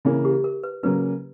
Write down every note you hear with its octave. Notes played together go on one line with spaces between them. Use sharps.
C#3 E3 A#3 C#4 E4
G4
A#4
B4
C#3 F#3 A#3 C#4 B4